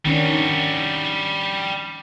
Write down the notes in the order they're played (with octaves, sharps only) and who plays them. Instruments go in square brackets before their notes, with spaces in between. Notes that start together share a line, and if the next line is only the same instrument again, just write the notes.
[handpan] D#3 C#4 D4 [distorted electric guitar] G3 F#4